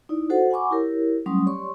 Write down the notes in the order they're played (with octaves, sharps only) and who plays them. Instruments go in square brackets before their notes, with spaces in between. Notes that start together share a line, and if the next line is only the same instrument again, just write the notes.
[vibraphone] D#4 E4 D5
F#4 A4 C5 F#5
F#5 G#5 B5 C#6 D6
E4 G4 A#4 C#5
F#3 G3 A3 C#4 C6 D#6
G4 C#5 D5 C6 C#6